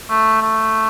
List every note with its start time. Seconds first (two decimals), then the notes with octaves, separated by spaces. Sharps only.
0.10 A3
0.41 A3